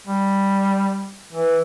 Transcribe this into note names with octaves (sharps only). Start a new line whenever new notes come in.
G3
E3